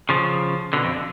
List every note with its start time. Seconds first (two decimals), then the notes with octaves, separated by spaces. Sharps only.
0.09 C#3 F3
0.73 B2 D3
0.84 F2